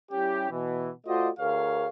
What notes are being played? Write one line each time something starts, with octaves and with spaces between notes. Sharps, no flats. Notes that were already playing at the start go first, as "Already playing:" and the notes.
G3 C#4 E4 G4
B2 E3
A3 F4 F#4 C5 D5 D#5
D2 G#4 A#4 C#5 F5